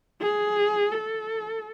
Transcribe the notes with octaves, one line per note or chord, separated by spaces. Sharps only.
G#4
A4